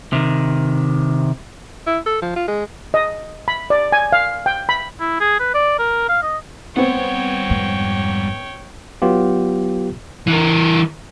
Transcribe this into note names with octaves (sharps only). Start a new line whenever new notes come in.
C3 D#3
E4
A4
F3
F4
G#3
D#5
B5
D5
G#5
F5
G5
B5
E4
G#4
B4
D5
A#4
F5
D#5
G3 B3 C4 C#5 F#5 G5
F2 G#2
F#3 B3 F4 G4
E3 A#4